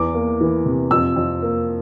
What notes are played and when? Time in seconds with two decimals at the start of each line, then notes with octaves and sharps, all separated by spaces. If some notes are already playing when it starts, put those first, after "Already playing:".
Already playing: E2 E3 D6
0.14 A#3
0.41 E3
0.65 C3
0.91 F2 E6
1.16 F2
1.42 A#3